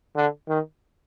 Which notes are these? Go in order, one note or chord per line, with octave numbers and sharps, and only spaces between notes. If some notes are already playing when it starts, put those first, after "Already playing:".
D3
D#3